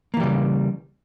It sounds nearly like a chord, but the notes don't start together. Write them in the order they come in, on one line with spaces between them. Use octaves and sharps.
A#3 E3 G3 C#3